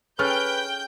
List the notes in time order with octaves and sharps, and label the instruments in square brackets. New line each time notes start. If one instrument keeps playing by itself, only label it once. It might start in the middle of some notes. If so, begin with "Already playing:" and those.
[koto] C#4 G#4 A4 [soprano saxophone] B4 [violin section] G5 G6 [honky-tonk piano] F6